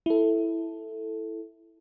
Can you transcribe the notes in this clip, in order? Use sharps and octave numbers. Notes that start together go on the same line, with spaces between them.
E4 A4